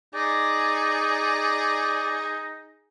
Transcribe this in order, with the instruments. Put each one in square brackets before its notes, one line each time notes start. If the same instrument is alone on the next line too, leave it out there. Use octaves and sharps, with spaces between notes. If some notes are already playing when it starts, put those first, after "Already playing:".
[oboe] D#4 [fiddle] G#4 [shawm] D5